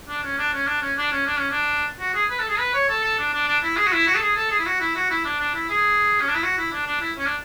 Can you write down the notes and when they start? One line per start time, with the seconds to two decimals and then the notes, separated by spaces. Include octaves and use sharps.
0.08 D4
0.23 C#4
0.38 D4
0.53 C#4
0.67 D4
0.82 C#4
0.97 D4
1.11 C#4
1.26 D4
1.39 C#4
1.50 D4
1.99 F#4
2.14 G#4
2.29 B4
2.39 A4
2.48 G#4
2.58 B4
2.74 C#5
2.89 A4
3.03 A4
3.18 D4
3.33 D4
3.47 D4
3.63 E4
3.77 G#4
3.86 F#4
3.92 E4
4.07 F#4
4.15 A4
4.22 G#4
4.36 A4
4.50 G#4
4.59 E4
4.66 F#4
4.80 E4
4.95 F#4
5.10 E4
5.25 D4
5.39 D4
5.54 E4
5.69 G#4
6.20 C#4
6.28 D4
6.35 E4
6.43 F#4
6.58 E4
6.72 D4
6.86 D4
7.01 E4
7.17 C#4
7.26 D4